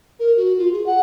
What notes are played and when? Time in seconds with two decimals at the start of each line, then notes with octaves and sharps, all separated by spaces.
0.19 A#4
0.37 F#4
0.58 F4
0.73 G#4
0.86 F#5